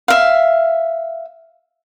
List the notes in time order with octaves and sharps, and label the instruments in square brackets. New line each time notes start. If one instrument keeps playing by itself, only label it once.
[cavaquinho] E5 F5